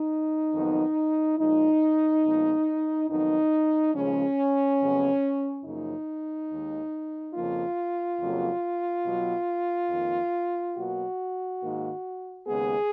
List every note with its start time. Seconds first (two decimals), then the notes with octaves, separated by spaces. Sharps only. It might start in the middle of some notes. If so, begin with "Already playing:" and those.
Already playing: D#4
0.54 F2 D#3 F#3 B3
1.38 A#2 F3 G#3 D#4
2.23 A#2 F3 G#3 B3
3.09 F2 D#3 F#3 B3 D#4
3.94 D#2 C#3 F3 G#3 C#4
4.80 F2 C#3 F#3 B3
5.64 F#2 C#3 F3 A#3 D#4
6.50 D#2 D#3 G#3
7.34 F2 C#3 F3 A#3 F4
8.20 F2 C#3 F#3 A#3
9.05 B2 F#3 B3
9.90 F2 D#3 A#3
10.76 B2 F#3 A#3 F#4
11.61 G#2 D#3 A#3
12.46 D#2 C#3 G#3 B3 G#4